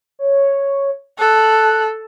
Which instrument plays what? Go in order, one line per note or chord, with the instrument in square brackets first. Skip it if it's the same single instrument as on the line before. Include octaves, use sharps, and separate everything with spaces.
[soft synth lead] C#5
[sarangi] A4 [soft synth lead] F#6